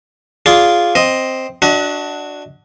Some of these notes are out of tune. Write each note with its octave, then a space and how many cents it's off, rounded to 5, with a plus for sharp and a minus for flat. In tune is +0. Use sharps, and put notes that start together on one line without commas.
F4 +0 G#4 +0 D5 -20
C4 +0 D#5 +0
D4 +0 F#4 +0 D#5 +40